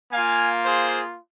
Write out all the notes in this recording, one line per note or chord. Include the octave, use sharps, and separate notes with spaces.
A#3 F4 F5 G#5
G#4 C5